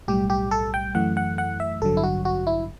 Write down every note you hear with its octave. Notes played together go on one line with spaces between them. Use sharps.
B1 A2 G3 G4
G4
A4
G5
F#2 E3 A3 F#5
F#5
F#5
E5
A1 G2 D3 F#3 A4
E4
F#4
F#4
E4